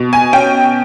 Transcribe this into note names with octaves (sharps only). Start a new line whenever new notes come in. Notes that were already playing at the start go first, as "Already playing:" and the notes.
Already playing: B2
G#5
C#4 G5